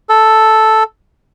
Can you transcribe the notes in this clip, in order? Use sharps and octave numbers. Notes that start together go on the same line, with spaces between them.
A4